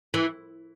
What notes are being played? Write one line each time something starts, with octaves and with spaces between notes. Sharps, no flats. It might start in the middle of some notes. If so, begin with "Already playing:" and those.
E3